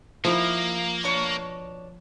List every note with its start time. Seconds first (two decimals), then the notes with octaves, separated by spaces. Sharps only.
0.25 F3 A#3 D#4 E4 E5
1.03 B2 D4 C#5